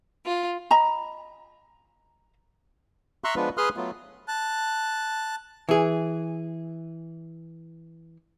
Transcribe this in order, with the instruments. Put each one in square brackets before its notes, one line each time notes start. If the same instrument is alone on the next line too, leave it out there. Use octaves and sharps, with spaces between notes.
[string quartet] F4
[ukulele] D#5 A#5 B5
[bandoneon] E5 A#5 C6 C#6 E6 F#6
F3 G#3 B3 D4 F4 B4
G#4 B4 C6 D#6 F6 F#6
F#3 A3 B3 F4
[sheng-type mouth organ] A5 F#6
[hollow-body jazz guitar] E3 G#4